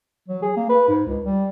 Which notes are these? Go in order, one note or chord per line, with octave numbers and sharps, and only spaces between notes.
F#3
G#4
A#3
B4
G#2
C#2
G3